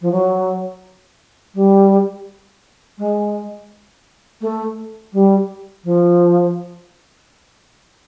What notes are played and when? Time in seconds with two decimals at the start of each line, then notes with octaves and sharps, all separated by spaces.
0.01 F3
0.12 F#3
1.54 G3
2.98 G#3
4.41 A3
5.13 G3
5.84 F3